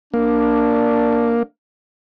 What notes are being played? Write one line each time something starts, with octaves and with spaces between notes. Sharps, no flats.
A#3 D4